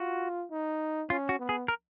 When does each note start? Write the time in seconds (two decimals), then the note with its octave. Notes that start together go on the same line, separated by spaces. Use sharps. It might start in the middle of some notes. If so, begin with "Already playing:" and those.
Already playing: F4 F#4
0.51 D#4
1.10 C#4 F4
1.29 F#4
1.39 B3
1.49 G#4
1.68 A#4